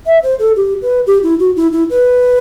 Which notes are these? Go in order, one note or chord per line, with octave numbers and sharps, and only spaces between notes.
E5
C5
A4
G4
B4
G4
E4
F#4
E4
E4
B4